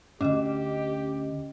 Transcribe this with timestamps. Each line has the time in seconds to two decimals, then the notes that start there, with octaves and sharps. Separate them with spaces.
0.21 D2 G#2 C#4 G4 D#5